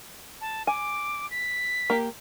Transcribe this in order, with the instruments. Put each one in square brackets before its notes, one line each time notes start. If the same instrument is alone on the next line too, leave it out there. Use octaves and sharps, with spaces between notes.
[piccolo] A5
[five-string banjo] G#5 [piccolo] D6
[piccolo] B6
[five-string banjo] A#3 G4